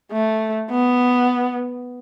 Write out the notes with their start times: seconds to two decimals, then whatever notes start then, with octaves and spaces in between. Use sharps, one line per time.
0.12 A3
0.71 B3